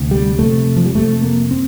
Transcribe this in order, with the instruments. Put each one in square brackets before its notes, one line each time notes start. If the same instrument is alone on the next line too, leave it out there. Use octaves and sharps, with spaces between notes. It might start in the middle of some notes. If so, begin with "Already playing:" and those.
Already playing: [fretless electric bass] D2 C3
G3
F2 C3 A3
F3
G3
F2 C3 A3
A#3
C4